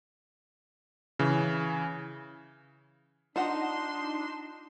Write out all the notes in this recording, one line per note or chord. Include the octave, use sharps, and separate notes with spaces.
C#3 E3
D4 D#4 F4 F#5 C6 E7